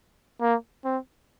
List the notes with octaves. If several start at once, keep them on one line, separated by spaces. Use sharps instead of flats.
A#3
C4